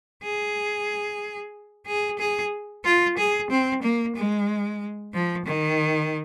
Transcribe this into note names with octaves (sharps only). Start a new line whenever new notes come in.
G#4
G#4
G#4
F4
G#4
C4
A#3
G#3
F3
D#3